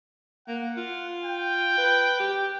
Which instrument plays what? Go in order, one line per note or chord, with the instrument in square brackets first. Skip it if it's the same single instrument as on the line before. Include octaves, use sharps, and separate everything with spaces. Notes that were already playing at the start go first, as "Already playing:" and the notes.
[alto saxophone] A#3 [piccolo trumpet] F#5
[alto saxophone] F4
[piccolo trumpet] G5
[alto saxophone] B4
G4